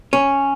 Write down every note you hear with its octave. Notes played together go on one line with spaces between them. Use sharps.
C#4